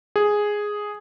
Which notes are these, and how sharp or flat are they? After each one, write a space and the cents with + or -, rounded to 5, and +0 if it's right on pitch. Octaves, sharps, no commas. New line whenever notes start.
G#4 +0